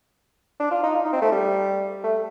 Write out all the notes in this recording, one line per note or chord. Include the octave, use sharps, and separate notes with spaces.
D4
F4
D#4
F4
D#4
C4
A3
G3
A3